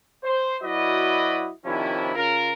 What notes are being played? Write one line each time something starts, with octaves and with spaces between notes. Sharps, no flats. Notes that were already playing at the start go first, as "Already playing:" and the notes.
C5
F#3 E4 F#4 B4 D5 D#5
C3 D#3 F3 C#4 D4 E4
C#3 F4 A#4